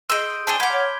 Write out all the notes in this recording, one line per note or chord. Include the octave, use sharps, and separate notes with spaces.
G#4 D#5 C6 E6 G6 D7
C4 D4 G#4 A5 C6 G7
F5 F#5 B5 D6 G#6 B6
C#5